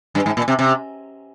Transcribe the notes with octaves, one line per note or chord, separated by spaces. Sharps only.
G2
G#2
A#2
C3
C3